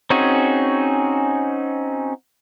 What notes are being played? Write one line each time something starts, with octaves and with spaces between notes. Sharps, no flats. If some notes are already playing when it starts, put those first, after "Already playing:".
C4 C#4 D#4 F#4 G#4